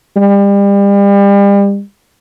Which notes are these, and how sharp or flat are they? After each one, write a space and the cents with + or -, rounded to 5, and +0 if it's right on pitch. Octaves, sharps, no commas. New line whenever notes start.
G3 +35